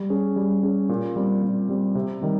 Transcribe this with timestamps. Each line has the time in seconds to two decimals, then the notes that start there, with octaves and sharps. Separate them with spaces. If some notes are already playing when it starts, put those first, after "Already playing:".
Already playing: G3
0.10 C#4 G#4
0.36 G3
0.63 C#4 G#4
0.89 A#2
1.16 G3 C4
1.43 A#2
1.69 G3 C4
1.95 C3
2.22 D#3 G3